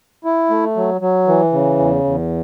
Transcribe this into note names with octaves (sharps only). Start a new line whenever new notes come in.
E4
A3
F#3
F#3
E3
C#3
E2
E2